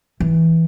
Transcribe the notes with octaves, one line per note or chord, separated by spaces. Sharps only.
E3